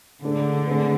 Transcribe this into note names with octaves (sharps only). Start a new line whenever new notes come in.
A2 D3 G#3 D4 A4
A2 G#3 C4 G#4 B4